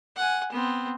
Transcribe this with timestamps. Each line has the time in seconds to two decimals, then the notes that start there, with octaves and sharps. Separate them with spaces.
0.16 F#5 G#5
0.52 B3 C4